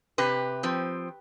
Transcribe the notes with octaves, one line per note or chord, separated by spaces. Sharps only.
C3 G4 B4
F3 C4